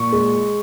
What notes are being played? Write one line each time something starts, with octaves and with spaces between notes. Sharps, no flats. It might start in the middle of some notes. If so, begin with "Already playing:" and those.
Already playing: A#2 C#6
G#3